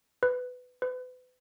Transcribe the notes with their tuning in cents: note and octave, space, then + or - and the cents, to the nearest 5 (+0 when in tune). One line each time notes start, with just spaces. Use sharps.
B4 +15
B4 +35